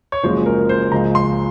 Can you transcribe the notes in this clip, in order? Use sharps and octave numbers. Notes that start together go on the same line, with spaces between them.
C#5
F#1 F#2 F3 G#3 C5
A#4
C5
C#2 C#3 F3 G#3 A#5
C6